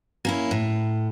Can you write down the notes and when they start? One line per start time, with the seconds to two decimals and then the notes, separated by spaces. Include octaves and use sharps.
0.25 A#3 C#4 E4
0.51 A2